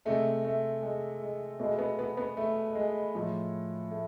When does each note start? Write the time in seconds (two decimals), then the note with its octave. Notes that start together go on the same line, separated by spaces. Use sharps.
0.05 C3 G#3 A3
0.44 A3
0.82 G#3
1.22 G#3
1.60 B2 G#3 A3
1.79 B3
1.99 B3
2.17 B3
2.37 A3
2.75 G#3
3.14 A2 F3 G#3
3.91 A3